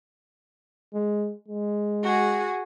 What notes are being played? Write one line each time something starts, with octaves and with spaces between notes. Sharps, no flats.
G#3
G#3
F#4 G#4